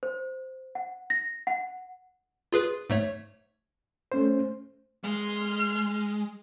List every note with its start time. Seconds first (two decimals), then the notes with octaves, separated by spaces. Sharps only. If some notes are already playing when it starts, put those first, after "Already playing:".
0.03 C5
0.75 F#5
1.10 A#6
1.47 F#5
2.53 F4 G#4 B4
2.90 G#2 A3 C#5
4.12 A3 C#4 C5
5.04 G#3 C6 F6